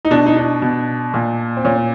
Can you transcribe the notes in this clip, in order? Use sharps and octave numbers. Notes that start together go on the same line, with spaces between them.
D#4
B2 D4
D#4
D4
B2
A#2
C4
A#2 C#4
C#4